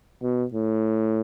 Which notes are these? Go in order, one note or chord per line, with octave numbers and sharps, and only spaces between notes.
B2
A2